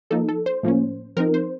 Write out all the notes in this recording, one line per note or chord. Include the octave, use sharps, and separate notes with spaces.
F3 A#3 D#4 A4
A4
C5
A2 F3 A#3 C#4
F3 C4 D#4 A#4
C5